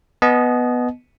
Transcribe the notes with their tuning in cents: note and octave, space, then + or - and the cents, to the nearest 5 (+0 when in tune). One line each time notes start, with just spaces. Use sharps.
B3 +0 D#5 -5 A5 -45